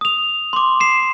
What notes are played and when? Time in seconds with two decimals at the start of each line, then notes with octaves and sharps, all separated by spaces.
0.01 D#6 F7
0.53 C6 D6
0.80 C7 E7